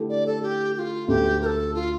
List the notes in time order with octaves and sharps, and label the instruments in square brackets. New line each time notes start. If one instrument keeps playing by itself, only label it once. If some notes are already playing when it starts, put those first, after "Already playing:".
Already playing: [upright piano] D3 A3 E4 G4
[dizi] D5
A4
G4
G4
F4
[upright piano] D2 D3 A3 [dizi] G4
[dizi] A#4
A4
F4